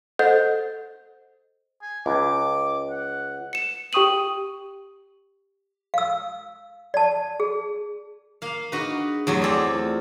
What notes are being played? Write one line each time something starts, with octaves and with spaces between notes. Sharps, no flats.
A4 C5 D#5 F#5 G6
G#5
C#2 D6
F#5
C#7 E7
G4 G5 C#6 D#6 D#7 F#7
F5 E6
D5 A5
G#4
A#3 F5
D4 D#4 F#4 G#4 B4
E2 F#3 A3 G4 G#4 C6
C4 A4 D5 G#5 D6
A3 F4